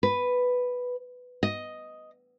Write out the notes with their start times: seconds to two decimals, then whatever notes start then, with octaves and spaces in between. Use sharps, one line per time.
0.03 B4
1.43 D#5